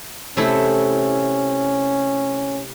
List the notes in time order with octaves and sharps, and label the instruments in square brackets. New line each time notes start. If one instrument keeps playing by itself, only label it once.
[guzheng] C3 A3 E4 [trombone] C#4